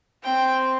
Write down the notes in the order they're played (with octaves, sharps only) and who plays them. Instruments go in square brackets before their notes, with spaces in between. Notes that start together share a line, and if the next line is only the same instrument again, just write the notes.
[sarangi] C4 [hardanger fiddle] G5